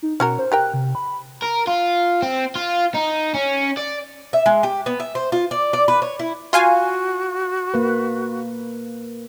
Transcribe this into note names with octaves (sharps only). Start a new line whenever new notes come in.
D#4
B2 C#4 F#4 A#4
C5
G4 A#4 G5 F#6
C3
B5
A#4
F4
C4
F4
D#4
C#4
D5
E5
G#3
G4
B3
E5
C5
F4
D5
D5
B4
C#5
E4
F4 F#4 F5 G#5
A#3 B4